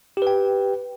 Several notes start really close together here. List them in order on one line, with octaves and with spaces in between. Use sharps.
G4 B4 G5